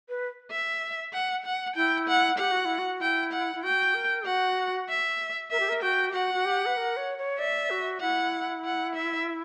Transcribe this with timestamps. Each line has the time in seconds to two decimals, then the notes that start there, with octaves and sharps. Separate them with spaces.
0.09 B4
0.51 E5
1.13 F#5
1.45 F#5
1.76 E4 G5
2.08 F#5
2.38 G4 F#5
2.51 F#4
2.65 E4
2.79 F#4
3.00 E4 G5
3.32 F#5
3.55 E4
3.64 F#4 G5
3.94 A#4
4.26 F#4 F#5
4.89 E5
5.51 A#4 E5
5.60 G4
5.69 A#4
5.82 F#4 G5
6.10 G4
6.14 F#4 F#5
6.34 F#4
6.45 G4
6.66 B4
6.77 A#4
6.97 C#5
7.18 C#5
7.39 D5 E5
7.70 F#4
8.01 E4 F#5
8.65 F#5
8.95 E5